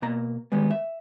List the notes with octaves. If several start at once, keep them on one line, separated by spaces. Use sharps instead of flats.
B2 A#3 A#5
D#3 G3 G#3 B3
E5